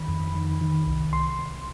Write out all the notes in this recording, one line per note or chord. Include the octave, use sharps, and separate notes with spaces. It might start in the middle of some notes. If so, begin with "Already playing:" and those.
Already playing: D#3 B5
F2
D#3
D#3
C2
C2 C6
C2